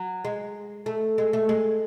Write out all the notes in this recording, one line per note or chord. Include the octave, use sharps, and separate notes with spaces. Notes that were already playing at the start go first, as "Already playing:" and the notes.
Already playing: F#3
G#3
A3
G#3
A3
G#3